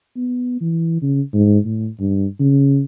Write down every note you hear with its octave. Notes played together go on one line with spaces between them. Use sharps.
B3
E3
C#3
G#2
A2
G2
C#3